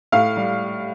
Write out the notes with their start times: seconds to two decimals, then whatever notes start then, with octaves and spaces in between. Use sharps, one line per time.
0.12 A2 F5
0.37 G3